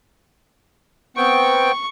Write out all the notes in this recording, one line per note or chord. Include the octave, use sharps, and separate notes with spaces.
B3 C4 G5 C#6